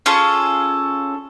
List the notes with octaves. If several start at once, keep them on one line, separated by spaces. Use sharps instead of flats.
C#4 F4 G#4 A4